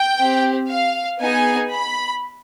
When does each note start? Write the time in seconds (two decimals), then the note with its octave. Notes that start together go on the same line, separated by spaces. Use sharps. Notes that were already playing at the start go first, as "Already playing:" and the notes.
Already playing: G5
0.18 C4 G4
0.69 F5
1.20 B3 D#4 G#4 G#5
1.72 B5